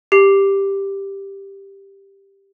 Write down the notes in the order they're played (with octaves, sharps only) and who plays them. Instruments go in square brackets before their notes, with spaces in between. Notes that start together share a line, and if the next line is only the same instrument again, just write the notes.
[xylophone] G4 C7